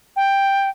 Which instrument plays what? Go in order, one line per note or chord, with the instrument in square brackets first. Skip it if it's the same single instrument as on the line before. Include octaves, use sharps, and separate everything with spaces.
[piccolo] G5